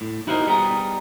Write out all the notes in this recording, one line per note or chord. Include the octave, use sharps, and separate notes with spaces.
A2
D#4 E4 F#4 A#4 C5 D#5
G3 B3 G#4 A#5